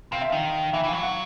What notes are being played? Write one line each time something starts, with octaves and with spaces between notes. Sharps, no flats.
C3 F5
E5
D#3 F5
E3 E5
E3
F5
F#3
F#5